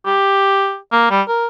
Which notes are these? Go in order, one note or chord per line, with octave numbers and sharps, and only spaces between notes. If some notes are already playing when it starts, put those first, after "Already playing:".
G4
A#3
G3
A#4